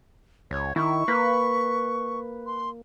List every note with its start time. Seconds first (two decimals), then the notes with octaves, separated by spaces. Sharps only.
0.51 C#2 C#5
0.76 D#3 E4 C#6
1.08 A#3 B4 B5
2.46 C6